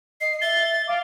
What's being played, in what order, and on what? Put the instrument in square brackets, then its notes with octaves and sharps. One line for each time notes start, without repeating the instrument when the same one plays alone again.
[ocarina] D#5 [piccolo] C7
[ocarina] E5 [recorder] A6 [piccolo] G7
[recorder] F5 [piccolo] D6